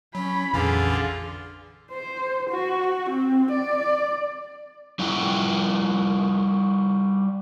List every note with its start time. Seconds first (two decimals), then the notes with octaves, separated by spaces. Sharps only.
0.15 F#3 C#4 B5
0.53 A#1 F2 A#2 D3 E3 C#4 F4 G#4
1.91 C5
2.50 F#4
3.09 C4
3.51 D5
4.99 G3 E4 F4 F#5 G5